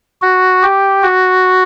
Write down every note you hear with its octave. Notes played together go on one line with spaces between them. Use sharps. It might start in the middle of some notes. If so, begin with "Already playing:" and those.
F#4
G4
F#4